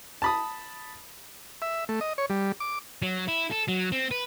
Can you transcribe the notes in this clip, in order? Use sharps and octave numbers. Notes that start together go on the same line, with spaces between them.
A5 B5 D#6
E5
A3
D#5
C#5
G3
D6
F#3
E4
A4
F#3
C4
B4